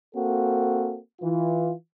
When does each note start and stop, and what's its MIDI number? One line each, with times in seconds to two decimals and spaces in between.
0.14 0.98 58
0.14 0.98 60
0.14 0.98 66
0.14 0.98 69
1.21 1.71 52
1.21 1.71 65